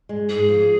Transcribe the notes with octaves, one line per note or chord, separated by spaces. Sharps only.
G#3
G#2 G#4
F3